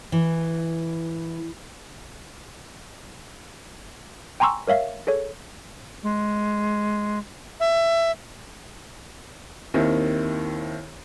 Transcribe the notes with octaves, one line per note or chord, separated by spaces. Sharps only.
E3
G5 G#5 A#5 C6 C#6 E6
A#4 C#5 E5 F5
G#4 A4 C#5
G#3
E5
D#2 D#3 C4 E4